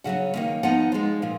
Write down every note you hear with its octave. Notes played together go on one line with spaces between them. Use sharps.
C#3 F#3 C#4 F#5
D#3 F#3 A#3 C#4
F3 B3 D#4 F#5
F3 G#3 D#4
A#2 F3